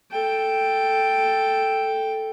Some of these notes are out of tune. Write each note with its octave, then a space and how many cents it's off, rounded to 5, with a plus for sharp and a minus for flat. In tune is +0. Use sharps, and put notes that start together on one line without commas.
A4 +0 G5 +0